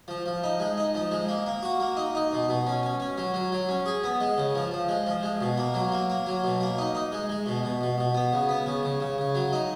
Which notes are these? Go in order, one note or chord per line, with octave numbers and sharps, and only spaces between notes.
F3
F3
D#4
G#3
D#4
F3
G#3
A#3
A#3
F#4
A#3
D#4
D#4
B2
B2
C#4
C#4
C#4
F#3
F#3
F#3
C#4
G#4
B3
G#3
C#3
F3
F3
G#3
F3
G#3
B2
A#3
F#3
A#3
A#3
F#3
B2
A#3
D#4
D#4
G#3
G#3
B2
B2
B2
B2
B3
C#3
B3
C#3
C#3
C#3
C#3
F#3
D#4